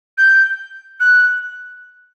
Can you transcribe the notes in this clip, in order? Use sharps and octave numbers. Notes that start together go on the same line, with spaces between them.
G6
F#6